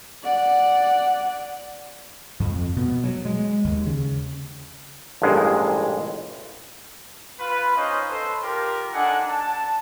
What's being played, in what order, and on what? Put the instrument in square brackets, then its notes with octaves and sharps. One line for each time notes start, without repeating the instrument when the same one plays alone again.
[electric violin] D5 F#5
[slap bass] F2
B2
F#3
G#3
D#2
C#3
[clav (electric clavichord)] A1 G2 A#2 G#3
[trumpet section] F4 B4
C#4 D#4 C5 D#5 F5
A4 B4 C5
F4 G4 A#4
D4 D#4 A4 F#5 G#5
A5